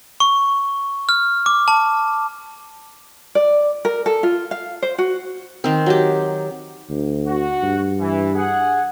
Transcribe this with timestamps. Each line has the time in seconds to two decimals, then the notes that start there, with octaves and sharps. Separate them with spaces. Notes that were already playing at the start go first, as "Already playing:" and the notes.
0.20 C#6
1.09 F6
1.46 D6
1.68 A5
3.35 D5
3.85 A#4
4.06 A4
4.23 F4
4.51 F5
4.82 C5
4.98 F#4
5.64 D#3 C4
5.86 F#3 G4
6.89 D2
7.27 F#4 F#5
7.63 G2
8.00 E3
8.35 G#4 F#5